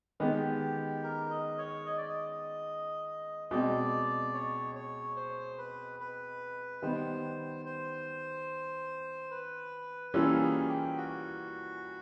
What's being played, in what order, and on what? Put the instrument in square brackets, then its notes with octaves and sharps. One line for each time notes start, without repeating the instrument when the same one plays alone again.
[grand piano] D#3 G#3 B3 [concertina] G4
[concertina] A#4
D#5
C#5
D#5
D5
D#5
[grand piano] B2 G#3 C4 [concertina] D5
[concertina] C#5
C#5
C5
B4
B4
[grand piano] D#3 G3 B3 [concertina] C5
[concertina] C5
B4
[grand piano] E3 G3 A#3 C#4 F4 [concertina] A4
[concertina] A4
G#4
G4
F#4